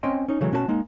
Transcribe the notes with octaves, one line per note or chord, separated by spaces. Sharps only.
C4 C#4 C#5 D#5 G5 C6
C#4 D#4
C#3 E3 F#3 G#3 A3
B2 C#4 F#4 C5 A5
G#3 A#3 D#4